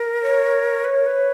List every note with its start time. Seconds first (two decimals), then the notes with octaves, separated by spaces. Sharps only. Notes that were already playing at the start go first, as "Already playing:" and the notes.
Already playing: A#4
0.23 C#5
0.84 B4
0.95 A#4
1.06 B4